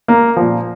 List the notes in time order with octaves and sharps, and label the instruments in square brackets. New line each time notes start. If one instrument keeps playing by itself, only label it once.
[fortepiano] A#3
A#2 F3